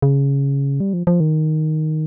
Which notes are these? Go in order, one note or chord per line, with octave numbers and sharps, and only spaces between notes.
C#3
G3
F3
F3
D#3